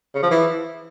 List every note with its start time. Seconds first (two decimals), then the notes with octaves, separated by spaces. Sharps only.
0.15 C#3
0.23 F3
0.31 E3